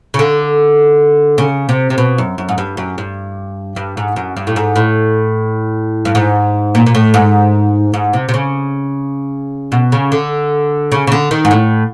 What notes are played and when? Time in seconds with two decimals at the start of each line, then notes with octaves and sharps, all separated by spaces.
0.14 C#3
0.19 D3
1.38 C#3
1.69 C3
1.90 C3
1.98 B2
2.18 F#2
2.38 F#2
2.49 G#2
2.58 G2
2.77 F#2
2.98 G2
3.76 G2
3.97 G#2
4.16 F#2
4.36 G2
4.47 A2
4.56 G#2
4.76 A2
6.05 G2
6.15 G#2
6.75 A#2
6.86 A#2
6.95 A2
7.14 G#2
7.94 G#2
8.13 C3
8.29 C3
8.34 C#3
9.72 B2
9.92 C#3
10.12 D3
10.92 C#3
11.07 C#3
11.12 D3
11.31 D#3
11.45 G#2
11.51 A2